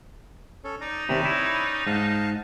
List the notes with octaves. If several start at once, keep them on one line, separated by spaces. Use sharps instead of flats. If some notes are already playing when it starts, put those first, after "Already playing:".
C#4 A4
D#4 D5 A#5
D#2 C3 C#4 D5 B5
E4
G#2 F5 A5